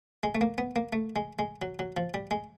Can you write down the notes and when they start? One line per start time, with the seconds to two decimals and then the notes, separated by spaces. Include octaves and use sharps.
0.23 G#3
0.35 A3
0.41 A#3
0.58 B3
0.76 A#3
0.93 A3
1.16 G#3
1.39 G#3
1.62 F#3
1.79 F#3
1.97 F3
2.14 G3
2.31 G#3